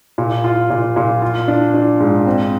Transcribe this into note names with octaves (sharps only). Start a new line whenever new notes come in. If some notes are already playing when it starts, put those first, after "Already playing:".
A#2
F4
A#2
A#2
F4
D4
D4
G#2
C4